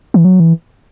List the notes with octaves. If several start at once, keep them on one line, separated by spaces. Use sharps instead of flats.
E3
F#3
E3